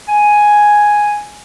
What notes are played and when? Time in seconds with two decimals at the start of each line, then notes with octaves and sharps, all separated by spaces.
0.09 G#5